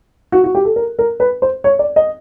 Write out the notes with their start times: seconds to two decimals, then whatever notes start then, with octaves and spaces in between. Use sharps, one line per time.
0.32 F#4
0.44 F#4
0.55 G4
0.65 A4
0.76 A#4
0.99 A#4
1.20 B4
1.42 C5
1.64 C#5
1.79 D5
1.96 D#5